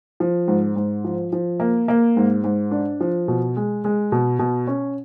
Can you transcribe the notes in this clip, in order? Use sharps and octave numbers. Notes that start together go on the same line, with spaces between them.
F3
G#2
G#2
F3
F3
A#3
A#3
G#2
G#2
D4
F3
B2
G#3
G#3
B2
B2
C#4